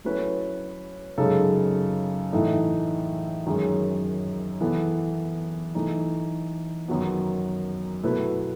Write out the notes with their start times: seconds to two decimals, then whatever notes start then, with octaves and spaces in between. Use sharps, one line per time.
0.04 F#3 A3 C#4 E4 B4
1.18 F#2 C#3 G#3 D#4 A4
2.32 A2 E3 A3 D#4 A4
3.46 F#2 D#3 G#3 C#4 G#4
4.61 E3 B3 E4 A4
5.75 E3 A3 D#4
6.88 F#2 D#3 F#3 B3
8.03 B2 A3 E4 B4